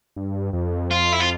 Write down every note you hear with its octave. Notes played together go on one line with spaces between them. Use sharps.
G2
F2
F4
E4
F4